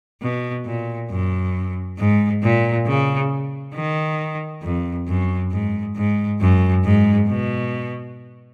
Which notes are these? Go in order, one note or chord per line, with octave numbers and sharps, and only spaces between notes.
B2
A#2
F#2
G#2
A#2
C#3
D#3
F2
F#2
G#2
G#2
F#2
G#2
B2